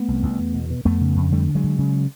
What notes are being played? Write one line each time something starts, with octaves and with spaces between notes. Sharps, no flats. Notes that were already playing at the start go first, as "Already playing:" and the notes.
Already playing: A3 B3
C2
C2
E2
B2
B2
F2 A3 B3
C#3
F2
D3 G3 A3
D2
F#3 G#3
D3
C#3